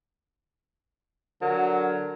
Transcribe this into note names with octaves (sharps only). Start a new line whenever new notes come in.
D3 F#3 A#4